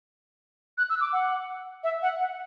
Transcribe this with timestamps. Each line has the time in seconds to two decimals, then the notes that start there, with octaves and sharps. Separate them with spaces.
0.78 F#6
0.90 E6
1.01 D6
1.13 F#5
1.84 E5
2.02 F#5
2.19 F#5